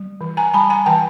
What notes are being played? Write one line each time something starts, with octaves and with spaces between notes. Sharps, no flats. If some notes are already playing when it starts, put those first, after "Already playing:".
Already playing: G3
E3
G#5 A#5
G3 A5 B5
G#5 A#5
E3 G5 A5